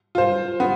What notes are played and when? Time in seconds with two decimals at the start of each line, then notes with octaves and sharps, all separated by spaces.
0.15 F4 C5
0.60 B3